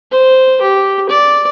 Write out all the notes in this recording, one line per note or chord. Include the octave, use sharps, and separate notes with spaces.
C5
G4
D5